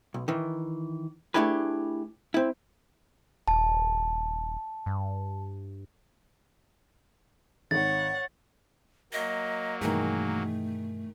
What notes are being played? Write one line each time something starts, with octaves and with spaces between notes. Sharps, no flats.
B1
D#3 E3
A3 D4 E4 G4 G#4 B4
C4 E4
D#1 A5
G2
G#1 C#5 F#5 A6
F#3 A#3 D#5
G2 B2 D#3 E3 A3 G#4